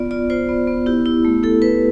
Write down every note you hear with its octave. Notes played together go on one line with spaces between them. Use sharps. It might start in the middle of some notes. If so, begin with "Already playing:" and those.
Already playing: B3 F4 D5
F4 D5
F4 C5
B3
B3
E4 G4
E4
A3
E4 A4
E4 B4